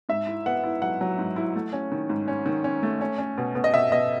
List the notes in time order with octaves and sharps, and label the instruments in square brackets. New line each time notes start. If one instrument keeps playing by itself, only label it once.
[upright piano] G#2 E5
E4
B3 F#5
E4
F#3 F#5
F#3
G#2
E4
A3
C#4
D#3
G#2
C#4
D#3
C#4
A3
C#4
C#4
B2
B2
D#5
B2 E5
B2 D#5